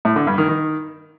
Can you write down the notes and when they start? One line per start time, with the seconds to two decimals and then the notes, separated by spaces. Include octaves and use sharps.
0.05 A2
0.16 D3
0.27 G2
0.38 D#3
0.49 D#3